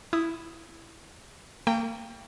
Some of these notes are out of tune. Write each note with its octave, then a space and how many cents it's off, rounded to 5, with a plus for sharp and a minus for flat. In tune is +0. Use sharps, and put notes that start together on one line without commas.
E4 +0 D#6 +0
A#3 -35 G5 +0